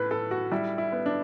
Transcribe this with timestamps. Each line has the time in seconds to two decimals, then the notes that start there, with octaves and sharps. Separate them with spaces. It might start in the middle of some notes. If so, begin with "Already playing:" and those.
Already playing: A2 B4
0.11 A2 A4
0.31 F#4
0.52 G3 E4
0.78 E4
0.92 B3
1.06 D4